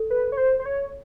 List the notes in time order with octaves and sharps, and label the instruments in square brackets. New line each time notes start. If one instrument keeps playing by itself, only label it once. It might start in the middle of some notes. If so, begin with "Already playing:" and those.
Already playing: [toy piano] A4
[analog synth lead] B4
C#5
C5
C5
C#5